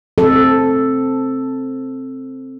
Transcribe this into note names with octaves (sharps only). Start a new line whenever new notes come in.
C4 A4